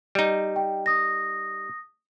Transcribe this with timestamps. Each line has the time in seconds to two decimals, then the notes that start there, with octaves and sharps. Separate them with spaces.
0.15 G3 D#4
0.56 G5
0.86 D#6 A#6